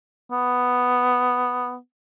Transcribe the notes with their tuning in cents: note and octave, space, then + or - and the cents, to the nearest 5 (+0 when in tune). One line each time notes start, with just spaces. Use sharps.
B3 +5